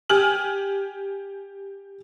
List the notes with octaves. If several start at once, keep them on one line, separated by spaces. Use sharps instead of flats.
G4 G#5 F6 F#7